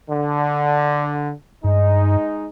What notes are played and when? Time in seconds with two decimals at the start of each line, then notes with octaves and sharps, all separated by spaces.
0.10 D3
1.64 G2 G#3 D#4